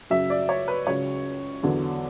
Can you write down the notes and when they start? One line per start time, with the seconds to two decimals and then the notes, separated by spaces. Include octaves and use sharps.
0.10 F#2 C#3 F#3 E5
0.30 D5
0.49 C#5
0.68 B4
0.87 C#2 C#3 F#3 C#5
1.63 E2 D3 F#3